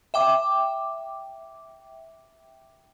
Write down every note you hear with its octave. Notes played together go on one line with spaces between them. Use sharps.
E5 G5 D6